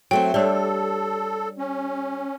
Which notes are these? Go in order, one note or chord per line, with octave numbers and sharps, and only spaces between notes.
F#3 A3 C4 G5
G3 D4 G4 A4 C#5 D5
C#4